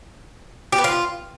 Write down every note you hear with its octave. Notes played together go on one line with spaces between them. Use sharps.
G4
B3
F4